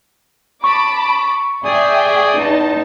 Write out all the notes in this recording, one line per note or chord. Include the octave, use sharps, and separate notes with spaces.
A5 B5 C#6 D6
G#4 D5 E5 G5 G#5 D#6
E2 D#4 A5